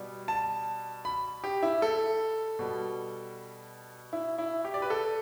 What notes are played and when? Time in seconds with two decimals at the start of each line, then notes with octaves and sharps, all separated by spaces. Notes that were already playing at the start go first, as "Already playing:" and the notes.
Already playing: B2 G3
0.28 A5
1.05 B5
1.44 G4
1.63 E4
1.82 A4
2.59 B2 G3
4.13 E4
4.38 E4
4.65 G4
4.74 D5
4.82 B4
4.90 A4